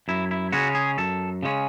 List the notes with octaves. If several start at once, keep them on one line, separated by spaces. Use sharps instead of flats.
F#2 E4
E4
C#3 G#3 C#4 F#4
G#4
F#2 A4
C#3 G#3 C#4